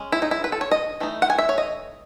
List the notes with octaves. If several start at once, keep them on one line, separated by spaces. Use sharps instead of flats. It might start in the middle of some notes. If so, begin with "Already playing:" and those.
Already playing: G#3 C#4
E4
D#4
E4
B4
A4
C#5
D#5
E3 A3 D#4
F#5
G#5
E5
C#5
D#5